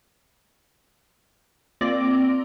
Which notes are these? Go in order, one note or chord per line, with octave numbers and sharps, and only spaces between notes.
A#3 C4 F4 D5 D6 A#6